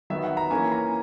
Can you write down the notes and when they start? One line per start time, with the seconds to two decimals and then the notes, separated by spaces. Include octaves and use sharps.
0.10 D#3 F#3 B3 E5
0.24 F#5
0.37 A#5
0.50 E3 A#3 C#4 G#5
0.72 A#5